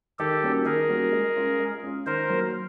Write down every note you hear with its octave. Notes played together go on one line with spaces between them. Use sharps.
D#3 G4 A4
G3 A#3 C#4 F#4
D#3 G#4 A#4
G3 A#3 C#4 F#4
G#3
C#4 F4
G#3
C#4 F4
D#3 A#4 C5
F#3 A#3